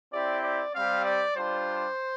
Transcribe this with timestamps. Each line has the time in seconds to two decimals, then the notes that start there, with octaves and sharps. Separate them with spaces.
0.13 C4 E4 G4 D5
0.43 D5
0.75 G3 C4 G4 F5
1.05 D5
1.36 G3 D4 F4 C5